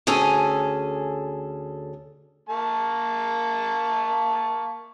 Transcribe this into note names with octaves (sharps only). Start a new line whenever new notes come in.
D2 C#4 G#4 A4 G#5
A#3 A5 C#6